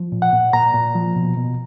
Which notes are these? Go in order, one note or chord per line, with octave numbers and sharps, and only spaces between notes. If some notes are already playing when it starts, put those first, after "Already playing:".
Already playing: F3
A#2
F#5
A#2
A#2 A#5
A#2
F3
B2
B2